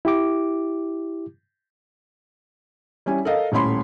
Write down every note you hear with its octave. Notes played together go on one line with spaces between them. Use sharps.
E4 G4 D6
G3 C#4 E4 G#5
A4 A#4 D#5 F5
D#1 A2 C#4 C#5 B5 C6